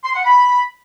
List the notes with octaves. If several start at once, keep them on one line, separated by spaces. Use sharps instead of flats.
C6
F#5
B5